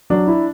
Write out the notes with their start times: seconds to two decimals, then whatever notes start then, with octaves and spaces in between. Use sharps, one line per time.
0.10 F#3 D4
0.27 E4